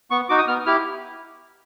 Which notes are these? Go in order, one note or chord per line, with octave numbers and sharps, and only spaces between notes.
B3 C#6
D#4 F#4 D6
D#6
B3 F6
E4 G4 F6